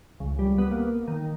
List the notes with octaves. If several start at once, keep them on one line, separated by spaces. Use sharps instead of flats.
C#2
G3
B3
A#3
D#3